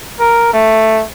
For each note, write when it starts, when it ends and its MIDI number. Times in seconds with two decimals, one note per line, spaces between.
0.20 0.53 70
0.53 1.03 57